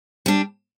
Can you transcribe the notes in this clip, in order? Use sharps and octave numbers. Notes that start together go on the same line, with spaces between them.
G3 D4